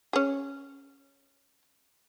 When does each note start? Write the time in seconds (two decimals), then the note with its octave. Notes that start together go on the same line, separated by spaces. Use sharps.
0.13 C#4 G#4